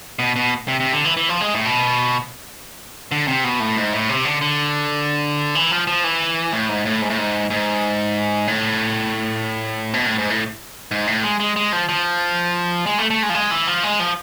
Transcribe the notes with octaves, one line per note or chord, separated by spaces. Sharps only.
B2
B2
C3
C3
D3
E3
E3
F3
G#3
A2
B2
D3
C3
B2
A2
G#2
A2
C3
D3
D3
E3
F3
F3
E3
A2
G#2
A2
G#2
A2
G#2
G#2
A2
B2
A2
G#2
A2
G#2
A2
G#3
G#3
G#3
F3
F3
G#3
A3
A3
G#3
F3
G#3
E3
F3
G#3
F3